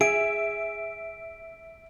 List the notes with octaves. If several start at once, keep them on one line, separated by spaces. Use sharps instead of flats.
G#4 E5 D7